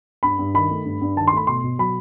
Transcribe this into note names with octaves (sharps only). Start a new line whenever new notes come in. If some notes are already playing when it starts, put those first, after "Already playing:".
G2 B5
G2
D#3 B5
A3
G2
G2
D#3 A5
C6
A3 B5
B2 C6
B2
F#3 B5